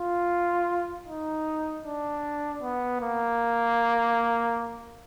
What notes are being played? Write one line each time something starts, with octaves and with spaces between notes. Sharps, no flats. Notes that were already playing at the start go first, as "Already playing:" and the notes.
Already playing: F4
D#4
D4
B3
A#3